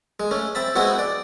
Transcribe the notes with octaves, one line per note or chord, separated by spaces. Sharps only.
G#3
A3 C#4
C4 E5 A5 B5
G#3 B3 C4 E4 F#4
D5